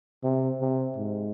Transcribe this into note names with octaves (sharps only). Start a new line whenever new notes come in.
C3
C3
G#2